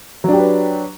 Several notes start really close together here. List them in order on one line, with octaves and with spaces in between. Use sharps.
F#3 D4 G4 B4